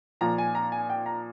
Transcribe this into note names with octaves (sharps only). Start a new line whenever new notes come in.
A#2 F3 A#5
G#5
A#5
G#5
G5
A#5